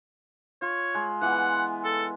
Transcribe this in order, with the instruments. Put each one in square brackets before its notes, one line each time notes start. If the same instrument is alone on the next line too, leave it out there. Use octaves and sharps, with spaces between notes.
[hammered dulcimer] F4 [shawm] C#5
[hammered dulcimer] G#3
[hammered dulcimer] E3 B3 [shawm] F#5
[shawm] A4